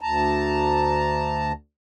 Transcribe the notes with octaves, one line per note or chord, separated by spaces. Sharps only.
D2 A5 A#5